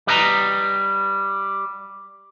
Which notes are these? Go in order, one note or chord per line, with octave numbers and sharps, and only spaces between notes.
G3 B4 D#5 A#5